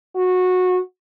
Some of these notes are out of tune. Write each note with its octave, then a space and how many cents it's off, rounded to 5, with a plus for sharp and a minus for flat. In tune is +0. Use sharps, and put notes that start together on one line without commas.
F#4 -20